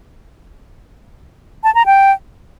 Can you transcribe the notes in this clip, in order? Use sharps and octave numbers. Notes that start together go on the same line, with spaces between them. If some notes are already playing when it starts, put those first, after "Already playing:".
A5
A#5
G5